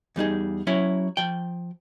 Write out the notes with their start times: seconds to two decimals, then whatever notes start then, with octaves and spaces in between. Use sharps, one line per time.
0.16 E2 G3 D#4 G#4
0.67 F#3 C#4 E4 C#5
1.17 F3 G5